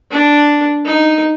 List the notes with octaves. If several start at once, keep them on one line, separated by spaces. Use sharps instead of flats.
D4
D#4